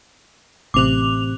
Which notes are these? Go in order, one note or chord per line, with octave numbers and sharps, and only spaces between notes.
A1 C3 D6 F#6 F7